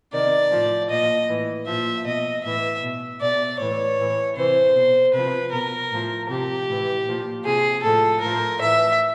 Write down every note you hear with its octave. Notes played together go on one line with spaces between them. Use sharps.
C3 D#3 D5
A2 F3
A#2 F3 D#5
A2 E3
A#2 F3 E5
B2 D#5
A2 E3 E5
B2
B2 D5
A2 E3 C#5
A2 E3
C3 E3 C5
B2
C3 F3 B4
B2 A#4
A2 F3
C3 F3 G4
A2 E3
A#2 F3
C3 F3 G#4
A2 F3 A4
A2 F3 A#4
A2 E3 E5